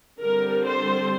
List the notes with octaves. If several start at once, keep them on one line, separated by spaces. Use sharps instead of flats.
D3 G3 C4 A#4
C5